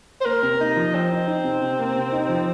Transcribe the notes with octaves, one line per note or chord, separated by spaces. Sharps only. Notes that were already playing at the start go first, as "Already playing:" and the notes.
C5
A#3 A#4
C3
A#3 D#4
F3
C4 D#4
D#4
D#4
C3
C3
A#3
C3
D#4
F3